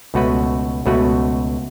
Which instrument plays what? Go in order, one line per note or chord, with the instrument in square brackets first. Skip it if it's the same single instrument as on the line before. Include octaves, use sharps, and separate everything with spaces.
[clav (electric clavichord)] C#2 B2 A3 F#4 B4
C#2 B2 A3 F#4 B4